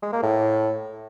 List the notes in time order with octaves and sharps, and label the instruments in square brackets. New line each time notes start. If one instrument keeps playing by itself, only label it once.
[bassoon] G#3
A#3
A2